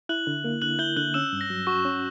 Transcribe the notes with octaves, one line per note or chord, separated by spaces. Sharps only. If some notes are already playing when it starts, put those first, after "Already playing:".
E4 F#6 F#7
D3
A#3
D3 F#6 F#7
E4 G6 G7
D3 F#6 F#7
C#4 E6 E7
G2
A#6
F#3
F#4 C#6
C#4